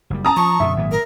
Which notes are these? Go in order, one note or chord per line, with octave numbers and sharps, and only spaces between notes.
F#1 G3
A5 A#5 D#6
F3 C#6
F#2 B2 D3 E5
G#1 A#2 F#3
A#4